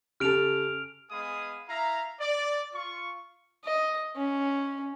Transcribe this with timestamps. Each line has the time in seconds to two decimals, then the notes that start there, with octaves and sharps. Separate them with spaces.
0.20 C#3 G4 A4 F6 D7 F7
1.11 G#3 B3 G#4 F5 B5 D#6
1.69 E4 E5 F5 A#5
2.20 D5
2.74 F4 C#6
3.65 D#5
4.17 C#4